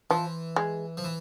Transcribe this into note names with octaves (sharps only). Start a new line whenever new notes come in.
E3 F3
G#3
F3
E3